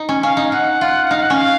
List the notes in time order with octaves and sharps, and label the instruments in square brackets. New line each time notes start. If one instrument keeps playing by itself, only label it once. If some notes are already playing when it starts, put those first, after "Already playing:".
Already playing: [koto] D#4
C#4
[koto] C#4 [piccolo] F5
[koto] D#4
[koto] D#4 [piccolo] F#5
[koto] F4
[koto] D#4 [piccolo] F5
[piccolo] F#5
[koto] C#4 [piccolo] F5